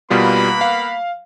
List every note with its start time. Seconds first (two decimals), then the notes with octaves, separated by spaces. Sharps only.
0.10 B2 G3 A#3 B3 F4 B5
0.61 F5